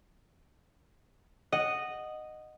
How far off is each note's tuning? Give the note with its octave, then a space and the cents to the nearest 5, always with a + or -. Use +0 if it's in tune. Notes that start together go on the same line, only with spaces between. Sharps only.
D#5 -10 F#5 +0